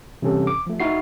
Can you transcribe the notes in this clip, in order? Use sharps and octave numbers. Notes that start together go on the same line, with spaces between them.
C3 E3 G3 C#4 G4 A4
D6
F3 A3
D#4 E4 F#4 C7